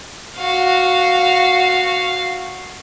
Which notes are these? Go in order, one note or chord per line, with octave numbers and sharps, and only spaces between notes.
F#4 F5